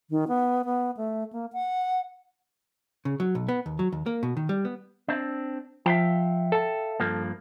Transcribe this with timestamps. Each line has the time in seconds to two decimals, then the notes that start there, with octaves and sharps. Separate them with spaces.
0.10 D#3
0.28 B3
0.65 B3
0.97 A3
1.33 A#3
1.53 F#5
3.05 C#3
3.20 F#3
3.35 B1
3.49 B3
3.66 D#2
3.79 F#3
3.92 D#2
4.06 A#3
4.23 B2
4.37 D#3
4.49 G3
4.65 B3
5.08 C4 D4
5.86 F3 E5 F5 G5
6.52 A4 A5
7.00 G2 F3 A#3